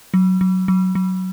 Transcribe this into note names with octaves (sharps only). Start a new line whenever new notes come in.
F#3
F#3
F#3
F#3